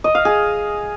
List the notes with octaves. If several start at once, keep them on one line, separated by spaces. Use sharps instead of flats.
D#5
F5
G#4